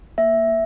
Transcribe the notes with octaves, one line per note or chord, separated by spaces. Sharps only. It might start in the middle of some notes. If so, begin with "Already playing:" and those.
A#3 E5